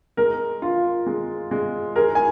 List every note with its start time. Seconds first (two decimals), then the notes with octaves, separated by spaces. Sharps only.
0.17 G#3 A#4
0.62 F4
1.06 G#3
1.51 G#3
1.96 G#4 A#4
2.15 G#5